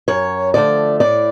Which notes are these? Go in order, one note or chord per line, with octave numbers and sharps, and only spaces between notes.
F#2 C#5
D3 F3 A3 D5
A2 D5